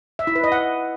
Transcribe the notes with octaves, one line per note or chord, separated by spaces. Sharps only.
E5
E4
B4
D#5
F#5